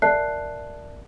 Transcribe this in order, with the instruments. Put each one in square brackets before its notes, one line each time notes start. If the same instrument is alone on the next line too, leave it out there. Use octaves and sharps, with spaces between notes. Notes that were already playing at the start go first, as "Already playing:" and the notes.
[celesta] A#4 D5 E5 A5 F#6 C7